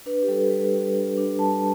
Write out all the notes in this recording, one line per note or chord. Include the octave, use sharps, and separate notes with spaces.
D4 B4
G4
G3 A4
G3 B4
G3
D4
D4
G3 A5